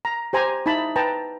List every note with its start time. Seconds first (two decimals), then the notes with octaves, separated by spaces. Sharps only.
0.05 A#5
0.33 G4 C5 G#5 A#5
0.66 D#4 E4 A5 B5
0.96 B4 G5 A5 A#5